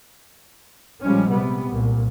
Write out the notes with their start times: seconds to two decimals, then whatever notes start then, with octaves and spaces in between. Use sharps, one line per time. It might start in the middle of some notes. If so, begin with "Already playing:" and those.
1.02 A#1 F3 G3 G#3 C#4
1.31 C3 G3 B3
1.69 C2 A#2